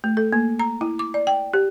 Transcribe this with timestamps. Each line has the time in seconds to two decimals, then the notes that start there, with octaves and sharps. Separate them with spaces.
0.04 A3
0.17 A4
0.33 A#3
0.59 A#5
0.81 E4
0.99 D6
1.14 D5
1.27 G5
1.54 G4